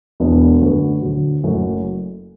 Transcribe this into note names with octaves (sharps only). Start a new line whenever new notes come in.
E1 E2 B2 B3 D4
F#2 D3 A3 F#4 B4
D2 D3 F#3
F#1 F#2 F#3 A3 F#4